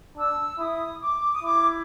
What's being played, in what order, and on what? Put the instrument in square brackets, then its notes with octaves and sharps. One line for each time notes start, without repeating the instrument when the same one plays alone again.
[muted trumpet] D4 [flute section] E6
[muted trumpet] E4 [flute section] D#6
[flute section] D6
D#6
[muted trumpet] E4 [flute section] D6